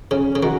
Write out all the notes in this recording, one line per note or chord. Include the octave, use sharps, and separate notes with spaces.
C#3 C#4
C#3
D#3 F#4